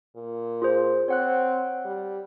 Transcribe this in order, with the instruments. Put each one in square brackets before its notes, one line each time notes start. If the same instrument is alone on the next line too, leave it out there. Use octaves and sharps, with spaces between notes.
[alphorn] A#2
[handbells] F4 G#4 C5
[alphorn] C4 [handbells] C#5 F#5 F#6
[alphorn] G3